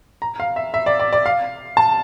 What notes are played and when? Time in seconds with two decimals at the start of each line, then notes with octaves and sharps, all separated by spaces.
0.22 A#5
0.40 F5
0.56 E5
0.74 E5
0.86 D5
0.99 D5
1.13 D5
1.26 F5
1.77 A5